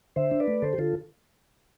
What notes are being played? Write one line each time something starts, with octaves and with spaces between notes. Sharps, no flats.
D3 C5 E5
D4
B4 D5
A3
D3 A4 C5
G4
D3 F4 A4